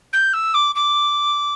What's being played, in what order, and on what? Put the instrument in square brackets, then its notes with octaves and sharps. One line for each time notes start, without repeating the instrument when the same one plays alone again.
[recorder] G6
E6
D6
D6